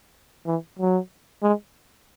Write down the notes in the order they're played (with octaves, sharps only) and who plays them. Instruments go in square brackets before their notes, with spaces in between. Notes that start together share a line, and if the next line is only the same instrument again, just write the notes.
[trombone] E3
F#3
G#3